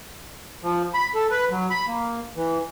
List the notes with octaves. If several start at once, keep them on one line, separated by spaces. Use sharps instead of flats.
F3
B5
A4
B4
F#3
B5
A#3
E3